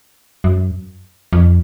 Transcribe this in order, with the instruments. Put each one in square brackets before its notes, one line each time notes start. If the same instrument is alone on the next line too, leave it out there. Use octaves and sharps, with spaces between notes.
[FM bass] F#2
F2